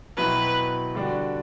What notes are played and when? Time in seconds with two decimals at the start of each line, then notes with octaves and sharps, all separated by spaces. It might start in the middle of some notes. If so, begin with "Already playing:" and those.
0.17 B2 F#3 C4 E4 B4
0.95 D3 G3 D4 F#4